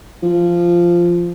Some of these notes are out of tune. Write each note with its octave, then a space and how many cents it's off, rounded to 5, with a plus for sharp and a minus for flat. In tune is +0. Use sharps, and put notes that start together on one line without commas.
F3 -10